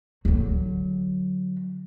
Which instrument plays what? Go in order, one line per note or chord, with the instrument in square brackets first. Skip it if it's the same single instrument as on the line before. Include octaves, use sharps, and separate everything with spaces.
[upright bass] D3 F#3